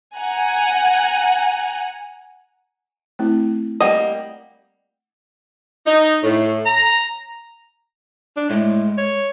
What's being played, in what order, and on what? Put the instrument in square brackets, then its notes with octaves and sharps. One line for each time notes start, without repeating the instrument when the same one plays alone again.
[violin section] F#5 G#5 A#5
[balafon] A3 C4 E4
[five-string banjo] G3 A#3 D#5 [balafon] F#5
[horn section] D#4
A2
A#5
[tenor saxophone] D4
[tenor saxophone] A2 [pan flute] G#3
[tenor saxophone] C#5